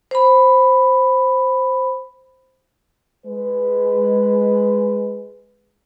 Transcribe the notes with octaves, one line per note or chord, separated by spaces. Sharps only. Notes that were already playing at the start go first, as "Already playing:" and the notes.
C5 B5
G#3 B4